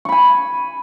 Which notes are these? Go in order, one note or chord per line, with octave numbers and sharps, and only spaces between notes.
G#5 B5 C#6